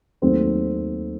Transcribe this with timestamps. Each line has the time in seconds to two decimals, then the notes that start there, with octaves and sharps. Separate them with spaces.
0.22 D#2 D#3 F#3 A3 C4